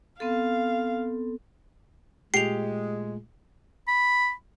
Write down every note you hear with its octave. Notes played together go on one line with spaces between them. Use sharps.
B3 C4 A4 F5
A#2 G#3 A3 F4 G4 C7 F7
B5